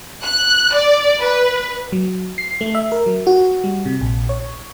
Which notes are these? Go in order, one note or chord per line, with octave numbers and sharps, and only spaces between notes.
F#6
D5
B4
F#3
C7
A3
E5
A#4
F#3
F#4
G3
C3
A#1
C#5